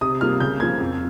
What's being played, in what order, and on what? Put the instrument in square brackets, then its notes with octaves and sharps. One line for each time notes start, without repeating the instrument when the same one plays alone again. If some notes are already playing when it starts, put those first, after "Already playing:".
[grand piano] C3 D#6
G3 A#3 F4 F6
C#3 G6
F3 A#3 G#6
F2